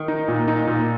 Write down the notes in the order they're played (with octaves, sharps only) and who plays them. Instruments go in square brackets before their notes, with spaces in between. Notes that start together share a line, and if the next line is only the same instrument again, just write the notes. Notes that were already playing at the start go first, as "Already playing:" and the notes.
Already playing: [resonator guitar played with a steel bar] D#3
[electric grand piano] D#4
A#2
D#4
A#2